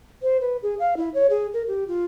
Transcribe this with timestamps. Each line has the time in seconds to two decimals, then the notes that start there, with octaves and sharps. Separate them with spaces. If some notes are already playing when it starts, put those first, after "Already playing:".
0.22 C5
0.41 B4
0.63 G#4
0.79 F5
0.97 E4
1.14 C#5
1.30 G#4
1.54 A#4
1.67 G4
1.88 F4